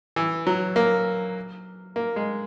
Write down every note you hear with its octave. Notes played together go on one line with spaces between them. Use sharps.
E3
F#3
A#3
A#3
G#3